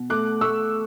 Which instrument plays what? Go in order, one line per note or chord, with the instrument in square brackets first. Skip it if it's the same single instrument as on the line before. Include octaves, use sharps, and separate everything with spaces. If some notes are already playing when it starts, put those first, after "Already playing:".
Already playing: [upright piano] B2
A3 D6 F#6
A3 C#6 E6